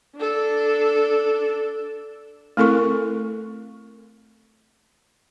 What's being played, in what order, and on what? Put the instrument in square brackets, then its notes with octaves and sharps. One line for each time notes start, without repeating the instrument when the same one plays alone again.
[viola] D4 A4
[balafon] A3 C4 E4 A4 A#4 C#6